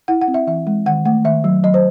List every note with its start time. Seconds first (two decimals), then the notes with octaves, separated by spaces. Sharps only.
0.08 E4 F#5
0.21 F#5
0.28 C4
0.34 E5
0.47 E3 E5
0.67 G#3
0.86 D#3 F#5
1.05 A3 F#5
1.25 D#3 E5
1.44 F#3
1.64 F#3 D#5
1.74 C5